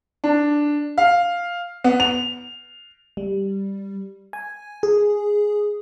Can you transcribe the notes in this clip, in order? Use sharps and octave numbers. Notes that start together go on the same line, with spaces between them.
D4
F5
B3
F7
G3
G#5
G#4